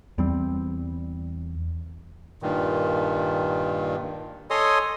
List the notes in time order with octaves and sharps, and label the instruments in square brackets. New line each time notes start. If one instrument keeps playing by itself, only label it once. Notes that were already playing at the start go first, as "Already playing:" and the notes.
[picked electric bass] E2 G3 C4
[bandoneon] G2 A#2 D#3
A4 C#5 D#5 G#5 C6 D#6